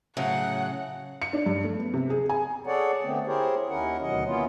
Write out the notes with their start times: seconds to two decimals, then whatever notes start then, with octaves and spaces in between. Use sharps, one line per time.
0.17 A2 C#3 F#3 F#5
1.22 C#7
1.33 D4
1.46 G2
1.64 A3
1.79 B3
1.94 C3
2.10 G#4
2.29 G#5
2.67 G#4 A4 C#5 D5 F#5
3.03 D3 A3 B3 C4
3.27 E4 G4 G#4 A#4 C5 C#5
3.70 D#2 D#3 C#4 E4 A#4 F#5
4.02 D2 B2 D#3 F#3 D#5 F#5
4.27 A#3 B3 C#4 E4 F4